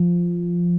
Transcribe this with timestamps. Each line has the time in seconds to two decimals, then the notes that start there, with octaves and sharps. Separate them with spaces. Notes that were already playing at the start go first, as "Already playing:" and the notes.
Already playing: F3